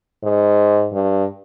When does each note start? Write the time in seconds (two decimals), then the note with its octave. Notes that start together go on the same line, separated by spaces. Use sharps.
0.23 G#2
0.93 G2